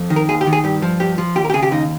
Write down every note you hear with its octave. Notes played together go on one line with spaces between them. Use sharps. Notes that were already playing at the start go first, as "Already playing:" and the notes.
Already playing: F2
D#3
A#4
D#2 G#4
G4
D#3
G#4
G2 G4
F3
G2 G4
F3
D#2 G4
A#4
G4
C#3 G#4
G4
D#2 D#4